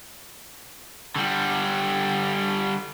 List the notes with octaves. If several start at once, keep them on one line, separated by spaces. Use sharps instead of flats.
D3 G3